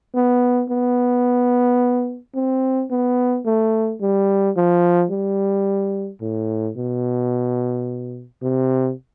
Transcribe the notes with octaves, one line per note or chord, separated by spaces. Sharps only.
B3
B3
C4
B3
A3
G3
F3
G3
A2
B2
C3